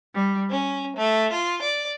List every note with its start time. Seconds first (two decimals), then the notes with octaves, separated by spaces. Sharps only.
0.14 G3
0.52 C#4
0.97 A3
1.33 F4
1.64 D5